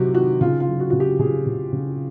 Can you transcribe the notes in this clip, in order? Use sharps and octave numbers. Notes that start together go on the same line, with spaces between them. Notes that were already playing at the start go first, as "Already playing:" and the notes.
Already playing: C3 D#3 F#3 F#4 G4
D#3 F#4
C#3 F4
F4
F#3
F#4
C#3 F#4
G4
C#3 G#4
C#3
C#3